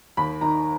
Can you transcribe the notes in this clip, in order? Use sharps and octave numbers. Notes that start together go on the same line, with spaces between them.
D#2 B5
D#3 A#5